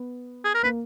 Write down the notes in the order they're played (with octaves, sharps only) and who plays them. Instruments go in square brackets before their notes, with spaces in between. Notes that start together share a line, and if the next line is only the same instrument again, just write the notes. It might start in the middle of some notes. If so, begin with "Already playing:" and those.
Already playing: [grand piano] B3
[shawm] G#4
A#4
[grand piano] A#3 [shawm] B4